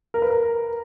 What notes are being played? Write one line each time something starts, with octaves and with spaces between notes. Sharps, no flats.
A#4
B4
A#4